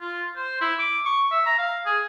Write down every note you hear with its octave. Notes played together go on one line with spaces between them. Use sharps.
F4
C5
E4
D6
C#6
E5
A#5
F5
G#4